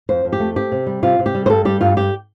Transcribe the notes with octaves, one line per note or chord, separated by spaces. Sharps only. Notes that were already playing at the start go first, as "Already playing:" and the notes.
F2 C5
F2
G4
A3
C4 G4
C3
G3
C3 F4
C3
G4
G3
C5
G2 A4
G3 G4
G2 F4
G2 G4